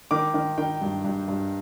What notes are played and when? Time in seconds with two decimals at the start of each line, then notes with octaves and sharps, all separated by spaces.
0.11 D#3 D6
0.34 D#3
0.58 D#3 G5
0.82 G2
1.05 G2
1.28 G2